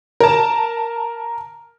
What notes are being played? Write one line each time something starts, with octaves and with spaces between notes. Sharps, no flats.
A#4 A5